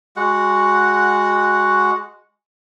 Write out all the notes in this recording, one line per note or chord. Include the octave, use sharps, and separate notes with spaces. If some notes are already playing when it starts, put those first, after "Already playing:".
G#3 F#4 F#5